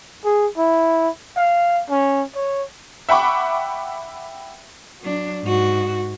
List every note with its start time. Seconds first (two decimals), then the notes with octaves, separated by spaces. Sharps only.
0.25 G#4
0.57 E4
1.37 F5
1.90 C#4
2.36 C#5
3.09 E5 F#5 G5 B5 C#6 D6
5.00 F#3 D4
5.43 G#2 F#4